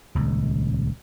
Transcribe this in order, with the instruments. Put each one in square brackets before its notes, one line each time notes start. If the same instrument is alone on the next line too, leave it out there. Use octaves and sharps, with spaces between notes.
[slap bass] D#1 C#2